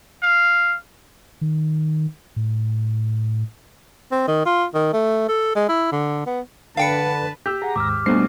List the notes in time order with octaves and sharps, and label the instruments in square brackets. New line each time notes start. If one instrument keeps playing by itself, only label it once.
[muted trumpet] F5
[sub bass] D#3
A2
[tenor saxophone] C4
D#3
F4
D#3
A3
A4
G#3
E4
D3
B3
[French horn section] D3 [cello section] B4 [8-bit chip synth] F5 G5 C#7 [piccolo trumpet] A5
[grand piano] G4 [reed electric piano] E6 G6
[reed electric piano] G#4 F#5 [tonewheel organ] A#5
[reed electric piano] D#2 G#2 E6 [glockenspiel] D6 F6
[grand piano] B1 B2 C7 [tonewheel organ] G3 A3 D4 [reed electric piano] C5